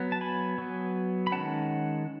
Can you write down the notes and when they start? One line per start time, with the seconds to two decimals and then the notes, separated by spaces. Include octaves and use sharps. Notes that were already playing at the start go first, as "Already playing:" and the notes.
Already playing: F#3 B3
0.12 A5
0.21 G#5 B5
0.58 F#3 B3
1.27 B5
1.32 D#3 G#3 C#4 F#5 A5